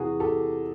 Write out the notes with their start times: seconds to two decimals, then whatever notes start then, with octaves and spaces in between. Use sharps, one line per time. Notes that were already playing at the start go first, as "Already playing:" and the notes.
Already playing: E2 C3 E3 F#4 G#4
0.20 G4 A4